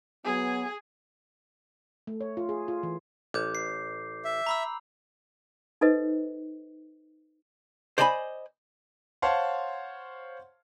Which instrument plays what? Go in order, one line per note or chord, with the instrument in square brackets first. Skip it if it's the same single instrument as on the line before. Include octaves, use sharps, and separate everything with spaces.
[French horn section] F#3 B3 [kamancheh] G#4
[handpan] A3
C#5
F4
G#4
F4
E3
[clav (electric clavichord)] A1 [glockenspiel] D6 G6
[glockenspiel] C7
[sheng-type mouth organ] E5
[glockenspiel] A#5 B5 E6
[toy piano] D#4 A4 B4 C5 D#5
[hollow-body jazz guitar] C5 D5 D#5 G#5 A5 B5
[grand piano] C5 C#5 F5 F#5 A5 C6